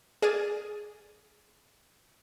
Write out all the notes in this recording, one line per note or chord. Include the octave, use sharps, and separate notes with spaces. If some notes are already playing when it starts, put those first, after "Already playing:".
G#4 D5 F6 A6 D#7